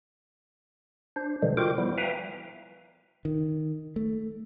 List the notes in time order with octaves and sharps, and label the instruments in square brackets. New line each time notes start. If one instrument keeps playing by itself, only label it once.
[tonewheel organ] D4 C5
B2 D3 E3 F3 G3 G#3
F4 F#4 A#4 C5 G5 D6
F3 G3 B3 E4
B4 E5 F5 G5 G#5 A#5
[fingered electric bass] D#3
A3